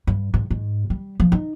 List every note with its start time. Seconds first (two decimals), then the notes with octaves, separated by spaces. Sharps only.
0.07 G2
0.34 G#2
0.50 G#2
0.90 G3
1.20 F3
1.32 D#4